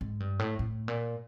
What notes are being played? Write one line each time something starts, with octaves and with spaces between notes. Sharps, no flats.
G#2
G2
A2
A2
A#2